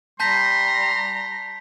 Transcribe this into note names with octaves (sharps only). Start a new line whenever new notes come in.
G3 A5 A#5 C6 G6 B6